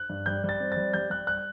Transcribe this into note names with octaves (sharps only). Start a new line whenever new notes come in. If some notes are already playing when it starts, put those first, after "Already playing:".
Already playing: F#6
G2
G3 G6
G3 A6
C4
A6
G3
G3 G6
G3 F#6
F#6